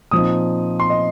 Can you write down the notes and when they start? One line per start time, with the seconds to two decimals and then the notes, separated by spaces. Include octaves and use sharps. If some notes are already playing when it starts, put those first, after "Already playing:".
0.11 A#2 F3 C4 D#4 D#6
0.80 C6
0.90 D#5